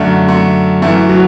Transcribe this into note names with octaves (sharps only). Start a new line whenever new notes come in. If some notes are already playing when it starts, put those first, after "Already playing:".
Already playing: F#2 D3 A3
A3
F#2 E3 A3
F#3